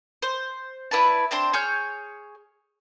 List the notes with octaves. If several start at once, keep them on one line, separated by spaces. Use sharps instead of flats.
C5
E4 B4 D5 A5
C4 D4 C5 C6
G#4 C#5 F6 G6